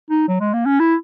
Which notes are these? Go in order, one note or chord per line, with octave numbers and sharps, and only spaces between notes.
D#4
F#3
G#3
A#3
C#4
E4